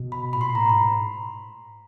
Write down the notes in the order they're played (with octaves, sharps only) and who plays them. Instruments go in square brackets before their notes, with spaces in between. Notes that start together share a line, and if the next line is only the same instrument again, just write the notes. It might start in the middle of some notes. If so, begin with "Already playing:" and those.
Already playing: [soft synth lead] B2
[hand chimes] B5
[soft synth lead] A2 [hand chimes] B5
[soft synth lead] A#2 [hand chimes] C6
[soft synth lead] A2 [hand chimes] A#5
[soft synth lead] G#2 [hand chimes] B5